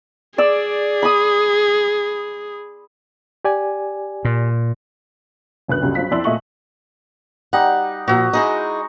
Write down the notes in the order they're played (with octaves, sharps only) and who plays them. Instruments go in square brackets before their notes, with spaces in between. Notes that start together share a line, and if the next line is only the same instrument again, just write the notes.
[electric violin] G#4 [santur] D5 E6
[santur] B5 C6 D#6
[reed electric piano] G4 D5 G#5
[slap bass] A#2
[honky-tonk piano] F#1 D2 B4 F#6
G1 C#2 F#3 G3
G2 F#3 C4 F4 B6
F2 E4 D5 C6 E6 F#7
A#2 A3 D#5 E5 C#6 F#7
[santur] G3 D#4 [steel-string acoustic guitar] F#5
[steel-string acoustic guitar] A#2 F3 [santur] F#4 E5 A#5
[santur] G#3 D#4 [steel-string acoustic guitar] E4 G#4 D#5